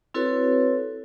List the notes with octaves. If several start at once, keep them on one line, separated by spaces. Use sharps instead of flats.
C4 E4 F#4 A4 B4 C#5